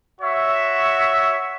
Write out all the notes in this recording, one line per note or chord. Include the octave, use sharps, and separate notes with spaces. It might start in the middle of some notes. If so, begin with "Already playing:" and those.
F#4 C#5 E5